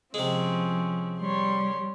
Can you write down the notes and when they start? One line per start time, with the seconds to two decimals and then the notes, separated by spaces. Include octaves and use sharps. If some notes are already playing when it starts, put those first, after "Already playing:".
0.14 C3 F3 G#3 C4 C#4
1.19 G3 C#5 C6